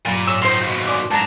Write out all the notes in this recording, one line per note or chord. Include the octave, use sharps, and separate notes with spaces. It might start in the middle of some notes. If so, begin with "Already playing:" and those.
G2 A#2 F#3
A2 C#5 E6
F3 D#4 C5 C6
D#2 B2
D5 G#5 C6 D6
G#2 D4 A5 A#5